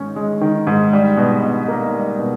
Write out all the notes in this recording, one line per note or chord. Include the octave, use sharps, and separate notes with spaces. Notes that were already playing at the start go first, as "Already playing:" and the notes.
Already playing: G#2 D#3 C#4
G#3
D#3
G#2
G3
B2
B2
A#3
G3
B2